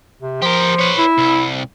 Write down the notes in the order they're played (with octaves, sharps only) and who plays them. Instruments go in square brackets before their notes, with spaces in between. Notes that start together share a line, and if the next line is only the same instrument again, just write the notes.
[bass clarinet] C3
[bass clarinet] F3 [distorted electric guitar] G4 A#4
[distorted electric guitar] B4 C#5
[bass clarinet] E4
[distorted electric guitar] C2